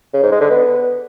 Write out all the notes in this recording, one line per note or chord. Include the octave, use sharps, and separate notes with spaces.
C#3
G#2
G#3
D3
B3